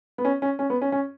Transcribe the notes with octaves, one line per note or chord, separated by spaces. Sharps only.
B3
C#4
C#4
C#4
B3
C#4
C#4